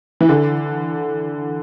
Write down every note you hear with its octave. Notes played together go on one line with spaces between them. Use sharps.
E3
D3